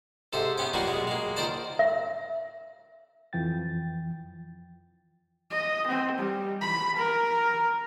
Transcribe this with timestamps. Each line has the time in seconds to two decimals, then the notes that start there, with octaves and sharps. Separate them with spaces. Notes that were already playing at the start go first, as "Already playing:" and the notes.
0.33 G#2 C3 A4 C5
0.58 B3 C#4 G5
0.73 F#3 G3 A#3 D#4 F4 F#4
0.86 B2 F#3 G#3
1.07 G#3 A#3
1.36 C#2 D#3 A#4 C5 D5 A5
1.79 E5
3.33 F2 E3 F3 G5 A6
5.51 D#5
5.87 C4
6.18 G3
6.61 B5
6.96 A#4